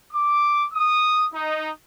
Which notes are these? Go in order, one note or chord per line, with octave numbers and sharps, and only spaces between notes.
D6
D#6
D#4